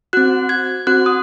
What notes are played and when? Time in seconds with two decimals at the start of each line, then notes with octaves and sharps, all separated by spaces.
0.13 C4 F#4 F#6
0.49 G#6
0.87 C4 F#4 F#6
1.06 D#6